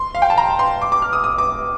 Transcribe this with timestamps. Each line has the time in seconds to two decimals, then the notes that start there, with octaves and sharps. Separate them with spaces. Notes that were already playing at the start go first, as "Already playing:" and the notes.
Already playing: C6
0.15 F5
0.22 G5
0.30 A5
0.37 A#5
0.59 C6
0.81 D6
0.92 D6
1.02 F6
1.13 D#6
1.24 D#6
1.38 D6